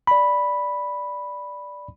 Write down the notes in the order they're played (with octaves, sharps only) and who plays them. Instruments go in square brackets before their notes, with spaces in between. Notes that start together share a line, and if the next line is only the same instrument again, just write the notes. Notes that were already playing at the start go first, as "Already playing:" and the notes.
[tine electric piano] D5 B5